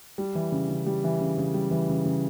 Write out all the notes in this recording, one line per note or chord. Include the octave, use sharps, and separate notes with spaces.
G3
E3
C#3
C#3
G3
E3
C#3
C#3
G3
E3
C#3
C#3